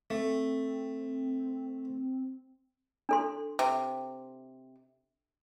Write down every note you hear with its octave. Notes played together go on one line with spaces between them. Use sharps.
A3 C4
D4 A4 C6
C3